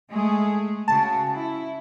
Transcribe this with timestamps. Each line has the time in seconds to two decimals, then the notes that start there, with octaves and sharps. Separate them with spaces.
0.11 G#3 A3 G#4
0.88 C#3 F#4 A5
1.33 E4